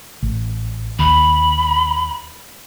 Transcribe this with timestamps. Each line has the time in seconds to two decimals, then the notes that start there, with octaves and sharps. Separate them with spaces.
0.23 A1
0.99 D#2 B5